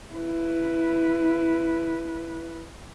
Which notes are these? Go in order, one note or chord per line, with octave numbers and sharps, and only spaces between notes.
E4 B4